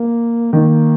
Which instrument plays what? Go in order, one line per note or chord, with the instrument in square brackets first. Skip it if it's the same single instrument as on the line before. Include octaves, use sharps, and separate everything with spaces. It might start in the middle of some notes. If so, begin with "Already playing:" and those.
Already playing: [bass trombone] A#3
[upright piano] D#3 [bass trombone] A#3